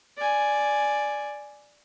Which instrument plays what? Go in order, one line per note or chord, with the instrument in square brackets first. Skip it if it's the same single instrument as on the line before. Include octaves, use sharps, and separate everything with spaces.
[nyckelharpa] D5 G#5